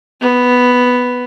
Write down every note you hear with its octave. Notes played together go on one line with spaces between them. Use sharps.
B3